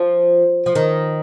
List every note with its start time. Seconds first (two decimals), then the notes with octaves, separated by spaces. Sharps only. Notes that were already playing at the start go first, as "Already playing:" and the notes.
Already playing: F3
0.66 F3
0.75 D#3